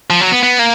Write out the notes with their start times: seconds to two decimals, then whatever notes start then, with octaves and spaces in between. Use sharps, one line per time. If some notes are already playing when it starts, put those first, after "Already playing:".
0.10 F3
0.21 F#3
0.32 B3
0.43 B3
0.59 A#3